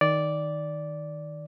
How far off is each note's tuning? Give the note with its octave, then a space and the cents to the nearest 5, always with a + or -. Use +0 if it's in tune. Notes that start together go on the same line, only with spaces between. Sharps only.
D#3 +0 D5 -10